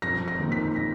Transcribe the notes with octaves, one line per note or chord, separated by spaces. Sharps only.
F2 A#6
A#6
D#3 A#3 D#4
B6
A#6